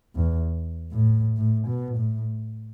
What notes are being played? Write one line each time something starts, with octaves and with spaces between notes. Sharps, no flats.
E2
A2
A2
B2
A2